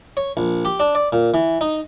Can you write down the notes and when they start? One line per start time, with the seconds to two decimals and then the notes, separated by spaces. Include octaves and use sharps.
0.17 C#5
0.37 A#1
0.65 G4
0.80 D4
0.95 D5
1.13 A#2
1.34 E3
1.61 D#4